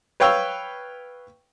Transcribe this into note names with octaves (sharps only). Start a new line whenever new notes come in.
B4 C#5 F5 G5 C#6 E6